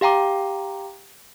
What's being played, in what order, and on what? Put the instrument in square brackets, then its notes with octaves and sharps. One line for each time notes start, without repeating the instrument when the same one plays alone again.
[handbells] G4 F5 G5 A#5 D6